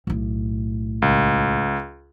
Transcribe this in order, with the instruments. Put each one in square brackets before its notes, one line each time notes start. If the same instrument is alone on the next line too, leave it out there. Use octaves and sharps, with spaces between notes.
[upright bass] B1 A2
[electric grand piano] C#2